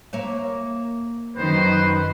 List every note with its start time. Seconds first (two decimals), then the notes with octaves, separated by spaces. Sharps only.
0.13 A#3 C#5 E5
1.37 F#2 D#3 B4 C5